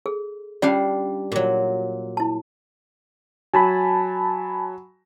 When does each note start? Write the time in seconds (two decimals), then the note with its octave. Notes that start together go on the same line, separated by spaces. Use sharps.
0.06 G#4 A4
0.62 G3 C#4 D4 F4 D5 F5
1.32 A#2 F#3
2.17 E4 A5
3.54 F#3 G#5 A5 B5